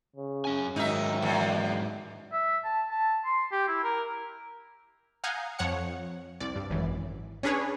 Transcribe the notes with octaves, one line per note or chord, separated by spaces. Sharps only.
C#3
F#2 C#4 G#5
G#2 D#3 F#3 D#4 E5
E2
E5
A5
A5
C6
G4
E4
A#4
F5 F#5 G#5 A#5 D#6 G6
F2 F3 C#5 F#5 C#7
C2 D5
G2
G#1 F#2 E3
C#4 D4 G#4 B4 C#5